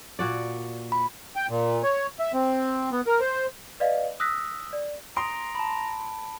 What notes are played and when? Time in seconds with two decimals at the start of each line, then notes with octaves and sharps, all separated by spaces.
0.19 A#2 F#4 D5
0.92 B5
1.36 G5
1.49 A#2
1.83 C#5
2.19 E5
2.33 C4
2.92 B3
3.07 A#4
3.20 C5
3.80 B4 D5 D#5 F5
4.20 D#6 E6 F#6 A#6 B6
4.73 D5
5.17 A#5 C6 D#6 D7
5.55 A5 B5